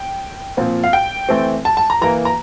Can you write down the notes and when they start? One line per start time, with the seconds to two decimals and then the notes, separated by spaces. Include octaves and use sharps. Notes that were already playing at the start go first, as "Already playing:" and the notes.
Already playing: G5
0.57 A#2 F3 C4
0.84 F5
0.93 G5
1.29 E3 A3 C4
1.65 A5
1.77 A5
1.90 A#5
2.01 E3 A#3 A#5
2.25 A#5